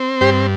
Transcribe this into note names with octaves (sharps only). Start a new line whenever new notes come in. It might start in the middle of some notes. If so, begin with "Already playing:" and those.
Already playing: C4
G2 G4 C5